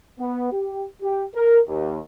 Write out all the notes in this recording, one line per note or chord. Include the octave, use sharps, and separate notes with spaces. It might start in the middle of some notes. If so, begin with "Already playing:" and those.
B3
G4
G4
A#4
D#2